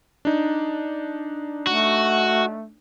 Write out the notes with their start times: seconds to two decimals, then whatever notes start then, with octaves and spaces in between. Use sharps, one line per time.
0.25 D4 D#4
1.67 A3 F#4